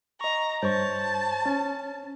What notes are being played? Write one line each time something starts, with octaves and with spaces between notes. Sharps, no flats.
D#5 A#5 C#6
G2 C5 C#5 A5 C#6
C#4